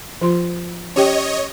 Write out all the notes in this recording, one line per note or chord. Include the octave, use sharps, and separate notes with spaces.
F3 F4 C6
C#4 G4 C#5 D#5 G5